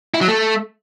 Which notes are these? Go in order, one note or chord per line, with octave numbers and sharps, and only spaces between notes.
E4
F#3
A3